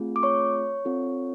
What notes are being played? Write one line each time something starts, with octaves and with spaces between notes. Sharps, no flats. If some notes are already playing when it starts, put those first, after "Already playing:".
Already playing: A3 C4 F4 G#4
D6
C#5 C#6
C4 F4 A4